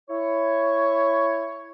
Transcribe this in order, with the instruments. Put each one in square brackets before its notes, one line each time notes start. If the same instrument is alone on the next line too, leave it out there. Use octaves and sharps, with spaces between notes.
[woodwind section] E4 C#5